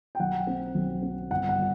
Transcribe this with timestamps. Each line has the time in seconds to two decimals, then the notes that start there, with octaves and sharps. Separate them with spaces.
0.15 G5
0.20 B1 F#5
0.47 C4
0.75 B1
1.03 C4
1.31 G1 F#5
1.49 F#5
1.58 G3